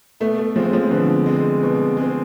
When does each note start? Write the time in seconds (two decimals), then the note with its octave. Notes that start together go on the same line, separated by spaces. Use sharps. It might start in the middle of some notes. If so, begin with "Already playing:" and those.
0.20 B2 A3
0.38 A3
0.56 F3 G#3 C4
0.73 F3
0.91 B2 D3
1.26 G#3 C4
1.63 B2
1.97 G#3 C4